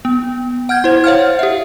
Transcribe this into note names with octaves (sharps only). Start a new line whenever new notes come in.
B3
F#5 F6 G6 G#6
E4 C5
C#5 F5 F#5 F6
G4 E5